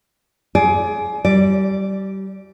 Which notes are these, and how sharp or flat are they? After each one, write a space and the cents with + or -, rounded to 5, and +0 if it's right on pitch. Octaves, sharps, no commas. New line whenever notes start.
G#4 +20 D5 -5
G3 -25 D5 +5